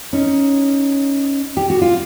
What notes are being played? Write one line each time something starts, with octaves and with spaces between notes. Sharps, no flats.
C#4 D#4
G4
F#4
F4